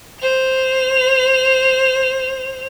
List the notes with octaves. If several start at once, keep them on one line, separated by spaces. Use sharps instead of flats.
C5 F7